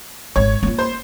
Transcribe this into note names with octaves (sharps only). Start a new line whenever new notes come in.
G#1 C#5 G#6
A#3 F4
C5 C6